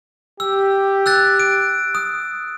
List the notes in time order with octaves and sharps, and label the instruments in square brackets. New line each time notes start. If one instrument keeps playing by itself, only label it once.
[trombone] G4 [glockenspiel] E6
[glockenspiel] E6 F#6 A6
D7
D#6